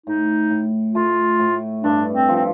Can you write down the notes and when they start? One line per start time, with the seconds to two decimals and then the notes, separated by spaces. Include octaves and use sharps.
0.06 A2 D#4
0.51 A2
0.95 A3 F4
1.39 A2
1.84 G2 D4
2.14 C4
2.29 F3
2.36 C4